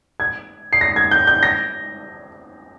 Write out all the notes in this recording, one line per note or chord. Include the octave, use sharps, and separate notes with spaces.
G#6
C7
A#6
G#6
G6
G6
A#6